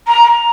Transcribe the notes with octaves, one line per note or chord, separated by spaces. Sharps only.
A#5
A#5